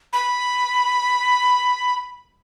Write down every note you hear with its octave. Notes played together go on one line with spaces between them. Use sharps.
B5